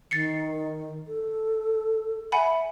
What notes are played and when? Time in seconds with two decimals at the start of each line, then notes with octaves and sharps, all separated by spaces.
0.11 D#3 A6 C7 C#7
1.08 A4
2.32 E5 F#5 G#5 B5